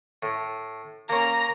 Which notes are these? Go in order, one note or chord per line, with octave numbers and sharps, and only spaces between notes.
A2
A#3 C#4 A#5